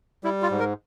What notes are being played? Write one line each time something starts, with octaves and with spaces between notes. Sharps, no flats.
G3 E4
F4
G#2
A#4